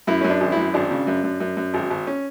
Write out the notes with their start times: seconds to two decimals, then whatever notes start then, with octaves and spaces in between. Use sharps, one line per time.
0.07 F#2 E4
0.21 F#2 C#4
0.30 D4
0.41 G#1
0.52 F#2 E4
0.74 G#1 D4
0.91 C#3
1.07 F#2
1.24 F#2
1.40 F#2
1.57 F#2
1.74 G#1
1.90 G#1
2.07 C#4